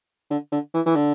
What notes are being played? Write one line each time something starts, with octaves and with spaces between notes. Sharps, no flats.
D3
D3
E3
E3
D3